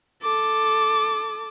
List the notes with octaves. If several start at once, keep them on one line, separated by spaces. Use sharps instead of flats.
A4 D6